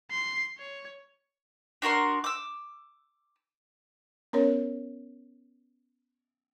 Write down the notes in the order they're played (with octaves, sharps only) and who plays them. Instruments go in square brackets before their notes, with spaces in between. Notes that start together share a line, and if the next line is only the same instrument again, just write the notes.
[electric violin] C6
C#5
[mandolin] D4 F#4 A#4 C6
D6 E6
[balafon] B3 C#4 A#4 C#5